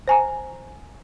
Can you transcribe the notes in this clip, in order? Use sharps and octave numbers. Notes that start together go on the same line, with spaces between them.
C5 G#5 A#5